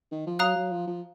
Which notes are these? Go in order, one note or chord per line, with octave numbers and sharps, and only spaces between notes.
D#3
F3
F#3 F5 A#5 D#6 F#6
F#3
F3
F3